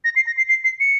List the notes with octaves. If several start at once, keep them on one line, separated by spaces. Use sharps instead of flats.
A#6
C7
A#6
C7
C7
C7
C#7